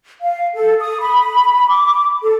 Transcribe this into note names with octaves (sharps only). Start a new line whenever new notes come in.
F5
A4
D#6
B5
D6
A4